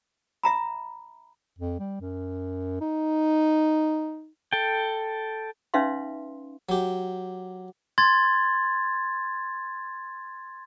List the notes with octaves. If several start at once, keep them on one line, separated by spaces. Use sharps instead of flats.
E5 A#5 B5
F2
G3
F#2
D#4
A4 G5
C#4 D#4 B4 E5 F5 C6
F#3 G4
C6 G#6 A6